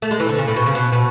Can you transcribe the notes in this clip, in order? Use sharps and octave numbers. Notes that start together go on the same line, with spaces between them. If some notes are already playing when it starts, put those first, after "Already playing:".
A3
G#3
E3
D3
C#3
A2
B2
C#3
B2
B2